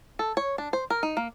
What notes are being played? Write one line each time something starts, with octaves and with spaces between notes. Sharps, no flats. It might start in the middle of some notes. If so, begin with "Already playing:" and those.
A4
C#5
D4
C5
A#4
D#4
A#3